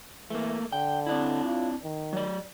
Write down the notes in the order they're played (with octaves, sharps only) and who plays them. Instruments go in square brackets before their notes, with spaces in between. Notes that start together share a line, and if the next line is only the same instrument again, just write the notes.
[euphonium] E3 [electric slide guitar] A3 A#3
[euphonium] D3 [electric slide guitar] G5
[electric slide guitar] C4 D4 E4
[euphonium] F4
D#3
[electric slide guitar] F#3 D5